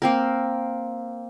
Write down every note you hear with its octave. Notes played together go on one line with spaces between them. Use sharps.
A#3 C4 A#4